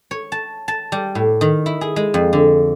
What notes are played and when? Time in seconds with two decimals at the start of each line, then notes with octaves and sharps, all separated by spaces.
0.11 C#5
0.32 A5
0.68 A5
0.92 G3
1.15 A2
1.41 D#3
1.66 E4
1.81 G#4
1.96 G#3
2.14 F2
2.33 D3